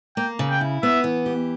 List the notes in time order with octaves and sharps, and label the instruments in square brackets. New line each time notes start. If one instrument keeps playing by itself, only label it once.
[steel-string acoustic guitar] A#3 [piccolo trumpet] G5
[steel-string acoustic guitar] C#3
[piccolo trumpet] G5
[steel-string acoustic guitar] E4
[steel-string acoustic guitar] B3 [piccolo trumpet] E5
[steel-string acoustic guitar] E3
G4